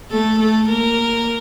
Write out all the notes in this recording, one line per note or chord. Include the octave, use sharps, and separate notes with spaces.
A3 A4
A3 A4
A#3 A#4